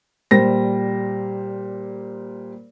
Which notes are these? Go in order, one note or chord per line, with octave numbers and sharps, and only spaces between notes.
A#2 G3 C5 A#6